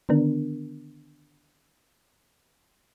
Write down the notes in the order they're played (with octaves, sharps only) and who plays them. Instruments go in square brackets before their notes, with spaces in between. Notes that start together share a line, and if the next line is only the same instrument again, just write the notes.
[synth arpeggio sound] D3 D#3 B3 D4 A#4